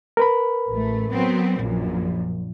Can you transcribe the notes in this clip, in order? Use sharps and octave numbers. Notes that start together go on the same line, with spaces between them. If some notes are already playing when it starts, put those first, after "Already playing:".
A#4 B4 B5
A1 A3
F#3 B3 C4
A#1 F#2 A#2